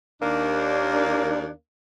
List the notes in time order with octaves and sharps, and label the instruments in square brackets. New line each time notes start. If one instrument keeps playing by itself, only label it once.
[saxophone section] D#2 D4 [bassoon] A#3